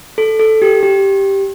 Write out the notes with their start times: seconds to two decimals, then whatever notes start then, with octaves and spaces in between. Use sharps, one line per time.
0.18 A4
0.40 A4
0.62 G4
0.83 G4